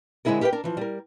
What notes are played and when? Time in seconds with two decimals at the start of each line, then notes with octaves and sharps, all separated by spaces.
0.25 D3 G#3 C4 E4 G#4 A#4
0.41 G4 A#4 B4 F5 G5
0.52 D4 A#4
0.64 E3 F3
0.77 G3 A#4